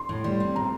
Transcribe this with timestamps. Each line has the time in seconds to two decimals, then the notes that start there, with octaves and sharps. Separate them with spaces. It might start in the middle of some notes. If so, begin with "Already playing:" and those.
Already playing: C6
0.09 A2
0.24 G3
0.40 C4
0.55 A2 A#5